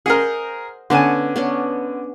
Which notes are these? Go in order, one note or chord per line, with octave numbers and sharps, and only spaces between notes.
G#4 A#4 C5 D#5 F#5
D3 B3 C#4 G#5 A5
B3 C#4 D4